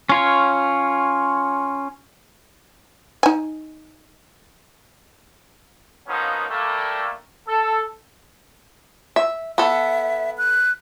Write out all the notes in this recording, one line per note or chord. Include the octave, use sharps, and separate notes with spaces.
C#4 F4 C#5
D#4 G#5
F3 F#3 A#3 B3 C#4 D#4
G3 A3 A#3
A4
E5
B3 A4 E5
F#6